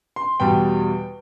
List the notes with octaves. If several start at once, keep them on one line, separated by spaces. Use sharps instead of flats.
C6
E2 B2 G3 G5